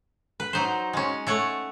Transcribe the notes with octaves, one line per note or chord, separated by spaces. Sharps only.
B4
F#3 D#4 C5
G#3 C#4
A3 C#5 F#5